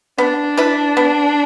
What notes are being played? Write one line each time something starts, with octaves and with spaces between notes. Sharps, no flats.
B3 D4
E4 B4
B3